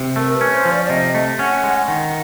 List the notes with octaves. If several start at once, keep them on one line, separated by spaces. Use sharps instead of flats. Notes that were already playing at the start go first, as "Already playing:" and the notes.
Already playing: C3
A3 A#4
B4
C#4
C5
F3
D5
D5
C3 D#5
A3
C#4 F#5
G#3
D#3